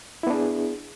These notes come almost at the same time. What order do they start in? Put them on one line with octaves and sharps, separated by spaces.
E4 B3 D4 G#4